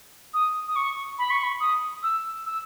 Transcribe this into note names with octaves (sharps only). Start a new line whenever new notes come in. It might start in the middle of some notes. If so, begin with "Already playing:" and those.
D#6
D#6
C#6
B5
C#6
B5
D#6
E6
E6